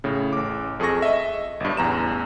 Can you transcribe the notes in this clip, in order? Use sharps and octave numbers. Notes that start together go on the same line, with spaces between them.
A2 C#3
A1 D6
F2 G#4 A4 C#6 A#6
D#5 E5
G1 G2
A1 E2 A#5 E7